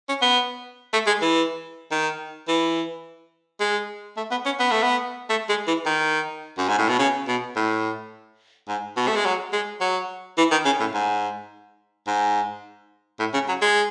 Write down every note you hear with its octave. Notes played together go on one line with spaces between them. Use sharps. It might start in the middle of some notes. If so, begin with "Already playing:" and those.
C#4
B3
A3
G#3
E3
D#3
E3
G#3
A3
B3
C#4
B3
A3
B3
A3
G#3
E3
D#3
F#2
G#2
A2
B2
C#3
B2
A2
G#2
B2
A3
G#3
F#3
G#3
F#3
E3
D#3
C#3
A2
G#2
G#2
A2
C#3
F#3
G#3